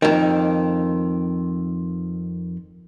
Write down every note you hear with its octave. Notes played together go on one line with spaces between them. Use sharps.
F2 D#3